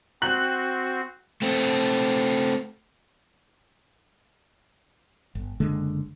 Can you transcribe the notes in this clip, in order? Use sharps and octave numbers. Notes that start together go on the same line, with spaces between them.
C4 F#4 F#6
A3 C4
G1
F#1 D3 G#3